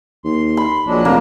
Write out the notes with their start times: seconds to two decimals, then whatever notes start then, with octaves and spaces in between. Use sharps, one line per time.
0.25 D#2 C6
0.57 B5
0.86 A#1 F#3 G#3 D4
1.05 F1 A#3